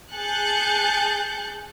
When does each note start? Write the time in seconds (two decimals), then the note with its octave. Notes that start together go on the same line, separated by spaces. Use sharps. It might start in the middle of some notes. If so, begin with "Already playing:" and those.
0.13 G#4 A5 F#6 G6 A6 C#7